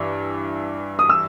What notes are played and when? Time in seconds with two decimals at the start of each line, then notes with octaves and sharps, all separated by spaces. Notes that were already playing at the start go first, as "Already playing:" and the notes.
Already playing: G2 E3
0.99 D#6
1.10 E6